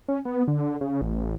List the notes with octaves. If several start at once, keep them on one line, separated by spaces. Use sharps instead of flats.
C#4
B3
D3
C#3
A1